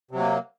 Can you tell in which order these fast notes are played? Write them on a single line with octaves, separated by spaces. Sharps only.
C3 F#3 A#3